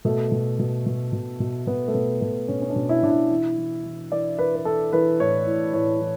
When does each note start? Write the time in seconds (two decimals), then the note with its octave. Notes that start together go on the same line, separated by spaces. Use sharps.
0.05 B2 A3
0.32 B2
0.59 B2
0.86 B2
1.13 B2
1.40 B2
1.67 B2 B3
1.88 A3
1.94 B2 B3
2.21 B2 A3
2.48 B2 C#4
2.61 C#4
2.70 D4
2.76 B2
2.89 E4
3.03 B2 D4
3.09 E4
3.31 E3
3.57 E3
3.85 E3
4.12 E3 D5
4.38 E3 B4
4.55 B4
4.65 E3 A4
4.93 E3 B4
5.20 A2 C#5
5.46 A2
5.73 A2 C#5
6.01 E3